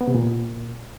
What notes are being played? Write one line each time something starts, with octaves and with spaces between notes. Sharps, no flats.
B3
C3
A#2